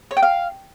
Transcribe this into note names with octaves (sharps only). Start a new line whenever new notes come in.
C#5
G5
F5